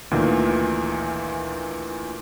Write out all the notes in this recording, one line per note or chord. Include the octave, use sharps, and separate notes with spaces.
D2 A#2 D#3 E3